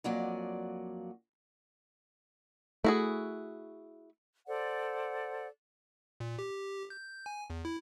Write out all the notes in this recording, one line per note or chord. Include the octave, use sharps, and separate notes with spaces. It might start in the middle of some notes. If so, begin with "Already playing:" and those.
F2 F#3 A#3 D5 F#5 G#5
A3 E4 F#4 G#4
A4 C5 D5 F#5
A#2
G4
G6
G#5
E2
E4